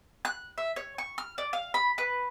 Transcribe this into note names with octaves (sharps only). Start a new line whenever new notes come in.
F#6
E5
C#5
C#6
F6
D5
F5
B5
B4